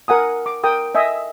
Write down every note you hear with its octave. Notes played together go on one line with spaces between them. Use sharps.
A#4 F#5 G#5 D#6
D6
A#4 G5 D#6
D#5 E5 G#5